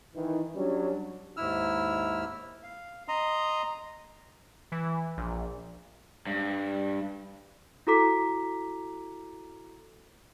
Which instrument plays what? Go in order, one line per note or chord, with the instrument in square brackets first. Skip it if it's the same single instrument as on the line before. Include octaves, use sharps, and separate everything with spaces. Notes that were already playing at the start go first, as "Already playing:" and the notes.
[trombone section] D#3 E3
F#3 G3 C#4 D4
[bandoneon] D#2 G#2 E4 E6 F6
F5
D#5 A#5 C6 D#6
[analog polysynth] E3
A#1
[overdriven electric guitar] G2
[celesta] E4 F#4 A4 A#5 D6 B6